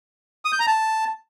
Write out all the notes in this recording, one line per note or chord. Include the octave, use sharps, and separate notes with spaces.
D#6
G6
A#5
A5